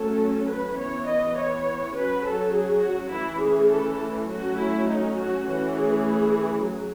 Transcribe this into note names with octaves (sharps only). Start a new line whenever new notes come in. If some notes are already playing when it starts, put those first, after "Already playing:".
Already playing: F#3 A3 C#4 A4
B4
E3 B3 C#5
D#5
C#5
F#3 C#4 B4
A4
G#4
F#4
E3 A3 C#4 E4
G#4
A4
F#3 A3 C#4 F#4
E4
D#4
F#4
E3 A3 C#4 F#4
G#4
F#3